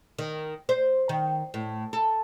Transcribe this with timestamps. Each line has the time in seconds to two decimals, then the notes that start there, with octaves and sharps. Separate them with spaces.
0.19 D#3
0.69 C5
1.09 D#3
1.54 A2
1.93 A4